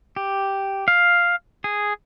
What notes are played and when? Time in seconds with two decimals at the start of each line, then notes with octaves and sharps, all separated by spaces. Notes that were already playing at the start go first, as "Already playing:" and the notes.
0.16 G4
0.88 F5
1.64 G#4